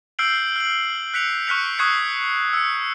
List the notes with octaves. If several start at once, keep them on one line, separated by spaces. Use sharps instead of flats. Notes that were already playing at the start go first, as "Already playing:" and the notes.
E6 F6 G6 C7 D7 F#7
F6 F#7
F#6 B6 C#7 F7
C#6 F6 F#6 B6 C#7 F7
C#6 D#6 F#6 G#6 C7 C#7
E6 C#7